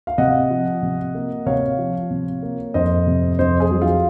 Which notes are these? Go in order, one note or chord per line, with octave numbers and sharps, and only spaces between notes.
F5
C3 D#5 F#5
F3
C3
A#3
C3 C#5 F5
F3
C3
A#3
F2 C5 D#5
C3
F2 C5 D#5
G#4 C5
F#3
F4